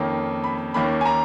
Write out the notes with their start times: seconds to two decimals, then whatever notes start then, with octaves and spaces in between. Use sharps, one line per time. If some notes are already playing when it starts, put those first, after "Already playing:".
Already playing: F2 D#3 A#3 C#4
0.44 B5
0.74 D#2 D#3 A#3 C#4 B5
1.01 G#5
1.05 A#5